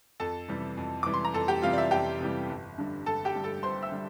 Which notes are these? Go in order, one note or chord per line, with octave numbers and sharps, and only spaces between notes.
F2 A4 A5
C3 E3 G3
F2
C3 E3 G3 D6
C6
A#5
F2 A4 A5
G4 G5
C3 E3 G3 F4 F5
D5
E5
F2 G4 G5
C3 E3 G3
G1
G2 D3 G3
G1 A4 A5
G4 G5
G2 D3 G3
A4 A5
G1 C5 C6
E5 E6
D3 G3